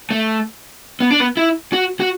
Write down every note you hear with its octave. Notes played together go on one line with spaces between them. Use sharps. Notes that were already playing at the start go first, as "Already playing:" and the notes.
A3
B3
D4
B3
E4
F#4
F#4